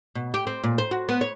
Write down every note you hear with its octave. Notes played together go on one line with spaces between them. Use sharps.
B2
G4
C4
A#2
C5
F#4
B3
C#5